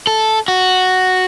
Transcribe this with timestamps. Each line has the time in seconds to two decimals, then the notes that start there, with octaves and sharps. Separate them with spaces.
0.07 A4
0.48 F#4